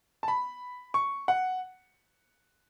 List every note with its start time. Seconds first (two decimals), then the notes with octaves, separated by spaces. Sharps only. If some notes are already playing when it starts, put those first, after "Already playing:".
0.23 A5
0.28 B5
0.94 C#6
1.28 F#5